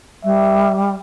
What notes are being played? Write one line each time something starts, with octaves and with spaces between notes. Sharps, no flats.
G3 E5